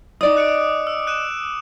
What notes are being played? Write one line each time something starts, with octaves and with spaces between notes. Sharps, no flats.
D#4 D5 D#5 D6 D#6
F#6 C#7 D7
E6
F#6 D#7 E7